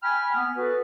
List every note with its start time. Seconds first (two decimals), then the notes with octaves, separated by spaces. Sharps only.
0.03 G5 G#5 B5 F6
0.35 B3
0.57 F#4 A4 B4